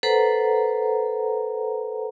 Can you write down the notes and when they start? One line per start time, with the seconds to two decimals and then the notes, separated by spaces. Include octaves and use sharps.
0.03 A4 B4 C5 F#5 A#5